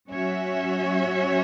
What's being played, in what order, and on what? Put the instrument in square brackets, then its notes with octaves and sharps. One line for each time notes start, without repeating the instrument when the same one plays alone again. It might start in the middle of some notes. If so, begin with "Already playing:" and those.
[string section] F#3 C#4 F#4 C#5 E5